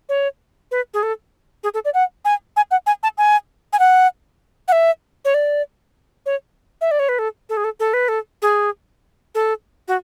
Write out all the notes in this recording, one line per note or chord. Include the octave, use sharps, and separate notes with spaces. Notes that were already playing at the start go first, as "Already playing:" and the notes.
C#5
B4
G#4
A4
G#4
A4
D5
F#5
G#5
G#5
F#5
G#5
A5
G#5
G#5
F#5
F#5
E5
C#5
D5
C#5
E5
D5
C#5
B4
A4
A4
G#4
A4
A4
B4
A4
G#4
A4
F#4